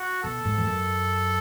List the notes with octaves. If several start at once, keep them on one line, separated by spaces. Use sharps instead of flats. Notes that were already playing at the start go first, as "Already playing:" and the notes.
Already playing: F#4
B2 A4
G#2
E2
F#2